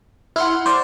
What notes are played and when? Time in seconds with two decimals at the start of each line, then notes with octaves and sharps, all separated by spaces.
0.36 E4 F#5 C6 F6
0.66 C5 D5